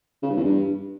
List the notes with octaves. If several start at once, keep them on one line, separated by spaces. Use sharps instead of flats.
C#3
G2
E2
G2